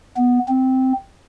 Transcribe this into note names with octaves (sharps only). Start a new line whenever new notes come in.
B3
C4